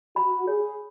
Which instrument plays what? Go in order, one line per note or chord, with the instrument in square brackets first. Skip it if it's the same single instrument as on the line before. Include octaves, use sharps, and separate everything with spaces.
[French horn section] F#4 [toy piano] B5
[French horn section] G#4 [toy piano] C#5